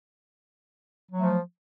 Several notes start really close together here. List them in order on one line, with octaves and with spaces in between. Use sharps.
F#3 A3 F3